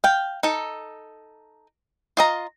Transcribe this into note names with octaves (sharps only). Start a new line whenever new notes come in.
F5 G5
D#4 A4
F4 D#5 A#5